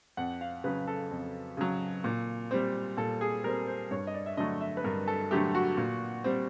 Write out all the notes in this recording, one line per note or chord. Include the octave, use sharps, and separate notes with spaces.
F2 F#5
F5
C#3 F#3 B4
A4
F2
C#3 F#3
A#2
G3 C4
A#2 A4
G#4
G3 C4 A#4
C5
G2 C#5
D#5
D5
E5
D3 F#3 A3 D#5
E5
B4
G2 A#4
A4
D3 F#3 A3 G4
F#4
A#2
G3 C4